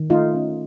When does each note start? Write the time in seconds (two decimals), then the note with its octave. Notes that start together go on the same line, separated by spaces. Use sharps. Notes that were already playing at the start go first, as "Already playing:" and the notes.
Already playing: D#3
0.10 A3 D#4 F4
0.35 C#4